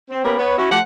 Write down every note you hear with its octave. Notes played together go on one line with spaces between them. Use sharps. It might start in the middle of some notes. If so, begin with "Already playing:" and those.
C4
A#3 B3 C#4 G4 A#4 B4
B3 B4 C#5
C#4 E4 F#4
F3 A3 G4 C5 F#5